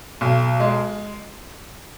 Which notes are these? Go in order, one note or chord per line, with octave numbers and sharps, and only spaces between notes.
B1
G#3